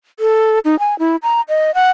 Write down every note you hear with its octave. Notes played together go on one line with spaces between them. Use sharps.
A4
D#4
G#5
E4
A#5
D#5
F#5